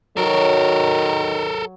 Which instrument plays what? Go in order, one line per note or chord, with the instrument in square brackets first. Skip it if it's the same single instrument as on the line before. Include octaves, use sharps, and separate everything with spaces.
[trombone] D#3 [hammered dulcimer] F#3 [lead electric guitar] A4 A#4